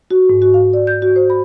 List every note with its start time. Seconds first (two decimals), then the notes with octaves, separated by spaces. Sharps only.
0.11 F#4
0.30 G#2
0.42 F#4
0.54 F5
0.74 D5
0.87 G6
1.02 F#4
1.16 C5
1.30 B5